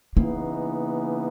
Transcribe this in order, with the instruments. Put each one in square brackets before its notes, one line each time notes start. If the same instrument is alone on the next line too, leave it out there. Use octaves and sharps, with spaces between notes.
[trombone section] C#3 E3 B3 D#4 [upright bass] A#3